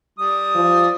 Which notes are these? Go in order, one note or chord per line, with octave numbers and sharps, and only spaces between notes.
G3 D#6
F3